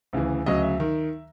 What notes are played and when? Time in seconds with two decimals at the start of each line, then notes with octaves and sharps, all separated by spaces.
0.13 D2 C#3 E3
0.46 D2 C#3 F#3 D#5
0.63 E5
0.80 D#3